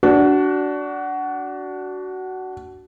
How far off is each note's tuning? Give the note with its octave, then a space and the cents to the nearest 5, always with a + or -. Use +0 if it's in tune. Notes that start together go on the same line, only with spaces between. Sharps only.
D4 -15 F#4 +15